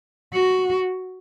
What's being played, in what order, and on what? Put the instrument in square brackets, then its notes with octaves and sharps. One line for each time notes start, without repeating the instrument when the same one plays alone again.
[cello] F#4